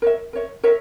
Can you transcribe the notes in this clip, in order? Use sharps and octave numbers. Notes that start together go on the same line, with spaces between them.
A#4 C#5 E5
A#4 C#5 E5
A#4 C#5 E5